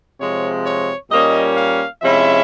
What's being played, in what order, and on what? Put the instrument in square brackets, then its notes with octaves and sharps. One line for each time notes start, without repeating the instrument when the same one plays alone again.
[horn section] C3 F3 G#3 C#5
C#5
A#2 G3 A#3 C#4 D#5
F5
C3 F3 G#3 C#4 E4 E5